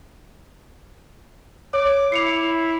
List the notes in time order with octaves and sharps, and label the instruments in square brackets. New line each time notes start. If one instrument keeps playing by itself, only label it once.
[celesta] C#5 [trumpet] D6
[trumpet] E4 [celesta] C7 C#7 F7